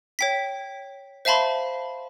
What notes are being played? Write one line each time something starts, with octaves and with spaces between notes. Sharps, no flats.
C#5 G5 B6
C5 E5 F5 A5 B5 C6